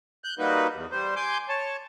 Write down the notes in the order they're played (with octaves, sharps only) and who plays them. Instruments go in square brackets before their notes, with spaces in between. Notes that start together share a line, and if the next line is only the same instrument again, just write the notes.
[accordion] F#6 G6
G3 A#3 D#4 F#4 B4
E2
G3 C5
G#5 C6 D6 G6
C#5 A5